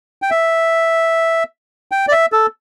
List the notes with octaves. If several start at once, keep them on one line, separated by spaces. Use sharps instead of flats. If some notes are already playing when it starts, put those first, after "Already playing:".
G5
E5
G5
D5
E5
A4